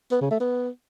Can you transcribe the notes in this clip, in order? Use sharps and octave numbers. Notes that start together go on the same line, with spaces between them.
B3
C#3
A3
B3